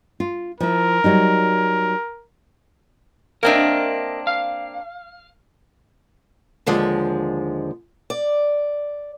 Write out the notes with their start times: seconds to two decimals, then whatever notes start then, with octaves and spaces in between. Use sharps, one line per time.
0.20 F4
0.60 F3 E4 A#4
1.04 F#3 G3 D#4
3.43 A#3 C4 D4 A#4 D#5 E5
4.27 F5
6.66 D#2 D3 F3 G#3
8.10 D5